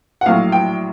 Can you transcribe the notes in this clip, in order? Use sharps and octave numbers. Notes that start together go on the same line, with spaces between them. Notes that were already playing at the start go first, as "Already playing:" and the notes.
F#5
A#1 A2 F#3 F5
G5